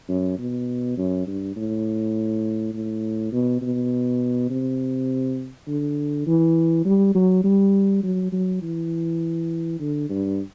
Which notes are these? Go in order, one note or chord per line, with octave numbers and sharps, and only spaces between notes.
F#2
B2
F#2
G2
A2
A2
B2
B2
C3
D3
E3
G3
F#3
G3
F#3
F#3
E3
D3
G2